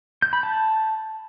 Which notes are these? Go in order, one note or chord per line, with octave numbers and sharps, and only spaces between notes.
G6
B5
A5